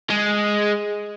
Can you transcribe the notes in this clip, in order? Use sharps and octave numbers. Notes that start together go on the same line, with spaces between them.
G#3